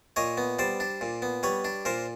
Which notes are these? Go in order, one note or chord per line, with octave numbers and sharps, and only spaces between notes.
A#2 C#5 D#5
B3
G3 C5 D5
D4
A#2
B3
G3 B4 C#5
D4
A#2 A#4 C5